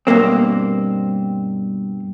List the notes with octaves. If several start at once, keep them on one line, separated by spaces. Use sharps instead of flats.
G2 B2 A#3 C4